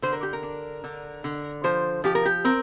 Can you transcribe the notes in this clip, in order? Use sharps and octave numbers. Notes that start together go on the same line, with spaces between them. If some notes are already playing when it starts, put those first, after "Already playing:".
D3 C5
A#4
G4
A#4
D4
D3
D3
F3 C5
F3 G4
A#4
G4
C4 A#4